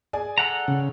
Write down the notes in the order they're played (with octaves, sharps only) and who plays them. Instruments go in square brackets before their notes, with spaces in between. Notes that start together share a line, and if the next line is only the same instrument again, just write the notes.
[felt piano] G#4 D5 G#5
[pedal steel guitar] A4 F#5 A#5
[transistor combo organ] C#3